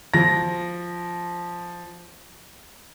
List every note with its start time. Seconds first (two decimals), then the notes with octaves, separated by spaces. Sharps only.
0.14 F3 A#6